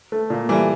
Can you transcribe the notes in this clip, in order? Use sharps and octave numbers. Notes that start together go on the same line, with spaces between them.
A3
A#2
E3 G3 A3